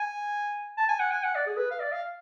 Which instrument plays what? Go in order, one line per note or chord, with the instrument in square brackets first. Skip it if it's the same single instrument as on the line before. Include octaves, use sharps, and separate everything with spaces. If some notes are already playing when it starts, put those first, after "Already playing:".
Already playing: [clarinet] G#5
A5
G#5
F#5
G#5
F#5
D5
G#4
B4
F5
D5
F5